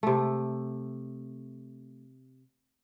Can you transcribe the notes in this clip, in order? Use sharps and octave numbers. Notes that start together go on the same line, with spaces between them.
C3 A3